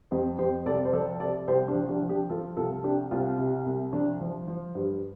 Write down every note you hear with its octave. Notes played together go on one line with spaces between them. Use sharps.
F2 G4 C5
F2 G4 C5
C2 A4 D5
C5
F3 A4 D5
C3 A4 D5
C2 G4 C5
D4 G4
F3
D4 G4
F3
D4 G4
F3 F4 A4
C2 F4 A4
C3 D4 G4
C2 C4 F4
C3
C2
F3 D4
F3
F3
G2